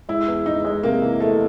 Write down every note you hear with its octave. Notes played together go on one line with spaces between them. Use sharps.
G#3 E4
E2
G#3 D#4
G#3
C3 A#3
E3
E3 A3